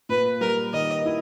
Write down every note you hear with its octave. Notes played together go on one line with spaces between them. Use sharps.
A#2 B4
G3 A#4
D#3 D#5
E4